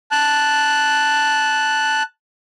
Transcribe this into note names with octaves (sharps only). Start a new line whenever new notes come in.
A5 F#6